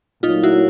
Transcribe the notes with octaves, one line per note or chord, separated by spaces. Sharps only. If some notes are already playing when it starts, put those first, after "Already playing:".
A#2 F#3 A3 D#4 F4
E4 F#4